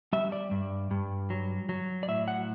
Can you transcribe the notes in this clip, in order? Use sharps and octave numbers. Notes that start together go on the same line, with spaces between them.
G3 E5
D5
G2
G2
F#3
F#3
D5
A2 E5
F#5